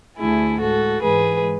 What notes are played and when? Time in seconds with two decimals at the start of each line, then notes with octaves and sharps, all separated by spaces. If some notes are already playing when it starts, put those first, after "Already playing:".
0.18 D2 D3 A3 E4 G#4
0.59 A2 G#3 F#4 A4
1.02 G#2 E3 G#3 G#4 B4